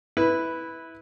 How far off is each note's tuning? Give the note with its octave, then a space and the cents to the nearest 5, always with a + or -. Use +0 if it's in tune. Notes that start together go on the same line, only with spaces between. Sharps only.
E4 -15 B4 +0